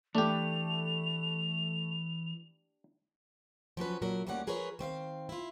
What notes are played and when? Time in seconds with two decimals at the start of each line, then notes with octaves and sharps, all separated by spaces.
0.15 E3 A3 D4 G4 F7
3.77 F3 F#3 C#4 B4
4.02 A#2 F#3 D4 E4 A#4
4.27 D2 G3 A#3 C#4 D5 F#5
4.47 F3 G#4 A#4 B4 C#5
4.79 D#3 C4 E5 F5
5.29 E4 F4